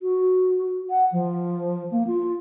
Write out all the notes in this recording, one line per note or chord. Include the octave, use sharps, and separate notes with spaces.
F#4
F#5
F3
A#3
F4